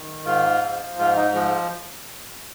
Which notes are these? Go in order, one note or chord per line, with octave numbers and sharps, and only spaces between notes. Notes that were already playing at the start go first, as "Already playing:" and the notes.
Already playing: D#3
G#2 F4
F3
G#2 F4
D#4
F3 G#3